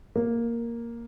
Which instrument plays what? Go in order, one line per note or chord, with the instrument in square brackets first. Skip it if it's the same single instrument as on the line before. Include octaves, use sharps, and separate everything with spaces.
[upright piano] A#3